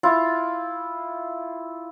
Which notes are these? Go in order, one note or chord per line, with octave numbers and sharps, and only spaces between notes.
E4 F4